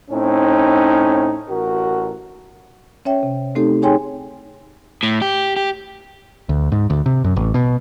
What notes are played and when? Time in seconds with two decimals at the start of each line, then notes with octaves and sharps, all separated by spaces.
0.11 A2 C4 C#4 D#4
1.49 A1 F#4 A#4
3.05 C#4 C#5 E5 G5
3.23 C3
3.55 A3 C4 D#4 G4 A4
3.82 D#4 G#4 C#5 G5 G#5 C6
5.03 A2
5.22 G4
5.56 G4
6.49 D2
6.72 G#2
6.90 D2
7.06 C3
7.24 F#2
7.36 A1
7.54 B2